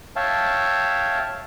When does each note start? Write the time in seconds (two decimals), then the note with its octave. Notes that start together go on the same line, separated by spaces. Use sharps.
0.16 C#5 E5 F5 G5 A5